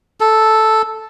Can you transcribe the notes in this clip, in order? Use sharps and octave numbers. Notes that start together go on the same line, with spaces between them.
A4